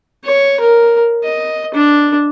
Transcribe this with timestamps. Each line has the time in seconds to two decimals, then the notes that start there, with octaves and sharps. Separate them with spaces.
0.25 C#5
0.60 A#4
1.23 D#5
1.74 D4